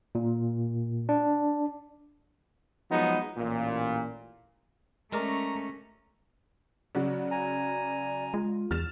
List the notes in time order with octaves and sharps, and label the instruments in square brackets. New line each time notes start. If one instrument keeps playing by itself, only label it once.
[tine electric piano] A#2
D4
[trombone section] F3 F#3 G#3 B3 D#4
A1 A#2
[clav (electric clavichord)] G#3 A#4 D5 [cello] A3 C#4 [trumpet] A#5
[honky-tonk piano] C#3 F#3 F#4 [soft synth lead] D5
[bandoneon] G#5 A#5
[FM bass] G#3 [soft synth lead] F4
[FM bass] E2 [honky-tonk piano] F6 A6 E7